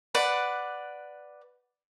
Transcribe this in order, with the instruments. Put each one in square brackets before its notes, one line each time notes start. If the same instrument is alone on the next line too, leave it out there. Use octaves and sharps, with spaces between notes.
[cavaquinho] B4 D5 F#5